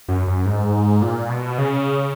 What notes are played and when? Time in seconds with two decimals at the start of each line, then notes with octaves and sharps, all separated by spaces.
0.08 F#2
0.27 F#2
0.46 G#2
1.02 A#2
1.29 B2
1.58 C#3